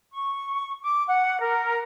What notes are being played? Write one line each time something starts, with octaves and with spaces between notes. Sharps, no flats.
C#6
D6
F#5
A#4